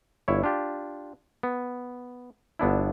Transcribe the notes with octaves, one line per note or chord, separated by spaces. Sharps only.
G1 E4 C#5
D4 F4 G4
B3
G1 B3 D4 E4